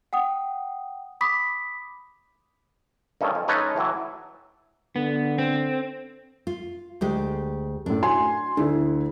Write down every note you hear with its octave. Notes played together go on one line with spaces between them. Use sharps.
F#5 G5 D#6
B5 D6 D#6 B6
G2 D#3 C#4 A4
F2
G#3 C#4 D#4 A4 B4 C#5
A2 E3 F#3 E4
D3 B3
C4
F4
D2 G#3 G4
F#2 A2 D4
F#4 G#5 C6
D2 D3 E4 A4